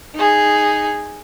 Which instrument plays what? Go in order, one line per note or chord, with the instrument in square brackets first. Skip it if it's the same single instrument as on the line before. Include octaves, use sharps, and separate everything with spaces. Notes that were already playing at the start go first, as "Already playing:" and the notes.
[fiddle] D#4 G#4